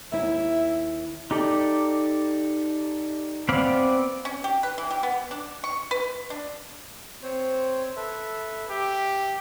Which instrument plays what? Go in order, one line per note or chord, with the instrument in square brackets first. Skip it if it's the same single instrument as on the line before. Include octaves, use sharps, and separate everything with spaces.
[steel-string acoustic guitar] D#2 E4 [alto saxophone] E5
[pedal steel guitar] D#4 G4 A4 D5
B3 C4 D5 F5 B5
[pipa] C#4
G4
B4
E3
G4
B3
D4
C#6
B4
D4
[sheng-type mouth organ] C4 C5 C#5
A4 B4 E5
[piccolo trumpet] G4 [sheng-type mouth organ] E5